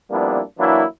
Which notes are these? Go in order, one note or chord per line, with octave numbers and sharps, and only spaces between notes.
F2 G3 A#3 B3 D4 E4
E3 F#3 A#3 D4 E4